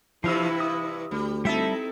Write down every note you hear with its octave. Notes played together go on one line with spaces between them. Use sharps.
G2 C3 E3 F3 E4 F5 E6
D#6
D2 G3
G3 C4 D#4 E4 A4 E5 A5